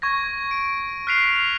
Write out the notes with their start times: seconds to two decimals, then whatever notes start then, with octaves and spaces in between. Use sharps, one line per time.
0.02 C#6 G#6 A#6
0.51 D7
1.07 F6 F#6 B6 C7 D7 F7
1.36 F7